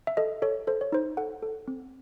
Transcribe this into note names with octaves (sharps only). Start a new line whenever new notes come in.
E5
A4 D#5
A4 C#5
A4 C5
C#5
D#4 C5
A4 F#5
A4
C4